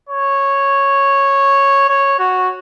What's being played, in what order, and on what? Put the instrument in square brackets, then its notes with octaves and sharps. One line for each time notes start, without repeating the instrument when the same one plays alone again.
[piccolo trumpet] C#5
C#5
F#4